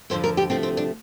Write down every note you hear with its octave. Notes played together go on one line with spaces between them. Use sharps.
F2 D3 F3 A3 C5
A#4
G4
D2 C3 F3 A3 C4
C4
D4